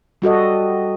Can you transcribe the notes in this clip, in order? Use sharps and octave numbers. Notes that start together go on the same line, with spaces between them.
G3 F#4 A4 D#5